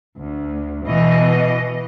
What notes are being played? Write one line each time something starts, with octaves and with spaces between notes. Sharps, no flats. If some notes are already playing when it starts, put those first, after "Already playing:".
D2
B2 E3 D#5